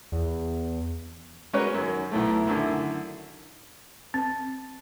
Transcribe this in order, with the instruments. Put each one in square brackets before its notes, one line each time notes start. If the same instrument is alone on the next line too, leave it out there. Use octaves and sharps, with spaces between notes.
[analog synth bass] E2
[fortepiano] G#3 C#4 F#4 A#4 B4 C#5
F#2 D#3
B1 A2 A3
F#2 D3 D#3 E4
[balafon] C4